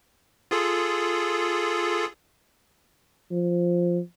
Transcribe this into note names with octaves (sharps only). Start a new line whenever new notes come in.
F4 G#4 A4
F3